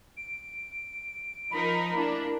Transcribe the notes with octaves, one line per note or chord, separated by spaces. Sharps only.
D7
F3 D#4 A#4 B5
A#3 D4 E4